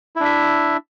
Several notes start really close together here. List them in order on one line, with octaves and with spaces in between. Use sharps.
E4 D4 E5